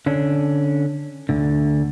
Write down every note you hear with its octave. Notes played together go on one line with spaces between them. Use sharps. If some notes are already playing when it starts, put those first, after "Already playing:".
D3 C#4 D4
D2 D3